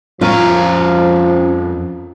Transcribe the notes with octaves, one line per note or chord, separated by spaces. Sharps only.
F2 F3 C#4 F4 A#4 F5 A#5